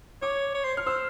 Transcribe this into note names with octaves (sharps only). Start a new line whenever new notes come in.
C#5 D6
C#5
C5
F6
C5 E6